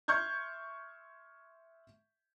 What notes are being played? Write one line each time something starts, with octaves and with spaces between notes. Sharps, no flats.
E5 C6 C#6 F6 G6 G#6